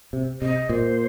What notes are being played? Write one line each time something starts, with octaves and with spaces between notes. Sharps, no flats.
C3
C3 D#5
A#2 C5